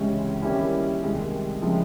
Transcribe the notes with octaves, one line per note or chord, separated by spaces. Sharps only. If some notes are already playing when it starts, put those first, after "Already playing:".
Already playing: C#2 C3 E3 G#3 C#4
D#3 G3 A#3 C#4 E4
C2 C3 D#3 G#3
C#3 F3 G#3 C4 E4